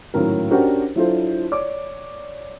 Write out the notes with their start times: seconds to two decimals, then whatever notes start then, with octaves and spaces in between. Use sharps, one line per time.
0.14 G#1 A2 F#3 C#4 A#4
0.50 C#4 D4 F#4 G4 A#4 C5
0.95 F#3 D4 E4 F4 A4 C5
1.52 C#5 D5 D6